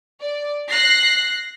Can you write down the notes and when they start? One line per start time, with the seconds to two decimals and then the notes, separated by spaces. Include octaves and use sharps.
0.20 D5
0.69 F#6 A#6 C7